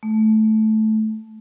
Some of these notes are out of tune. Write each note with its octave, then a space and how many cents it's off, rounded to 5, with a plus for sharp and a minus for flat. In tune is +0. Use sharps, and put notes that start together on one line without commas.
A3 -15